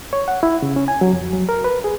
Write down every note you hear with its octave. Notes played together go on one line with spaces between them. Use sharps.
C#5
F#5
E4
C#3
C#4
G#5
F#3
F2
F#3
A#4
B4
G#4